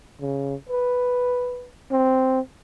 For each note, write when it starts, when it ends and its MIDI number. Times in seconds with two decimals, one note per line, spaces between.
0.21 0.55 49
0.69 1.69 71
1.92 2.40 60